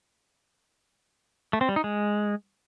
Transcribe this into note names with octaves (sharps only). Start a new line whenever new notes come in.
A3
C4
G3
D#4
G#3